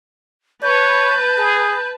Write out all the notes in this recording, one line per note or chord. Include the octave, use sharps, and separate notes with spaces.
B4 C#5 A5 G6
G#4